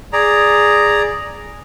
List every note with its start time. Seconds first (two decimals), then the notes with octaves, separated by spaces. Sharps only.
0.13 G#4 D5 A#5